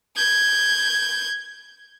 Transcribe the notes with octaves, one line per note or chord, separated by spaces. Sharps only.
G6 G#6